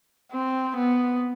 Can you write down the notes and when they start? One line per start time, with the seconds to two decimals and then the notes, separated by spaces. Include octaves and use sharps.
0.32 C4
0.77 B3